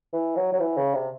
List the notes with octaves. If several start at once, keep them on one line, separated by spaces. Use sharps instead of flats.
E3
F#3
F#3
E3
C#3
C3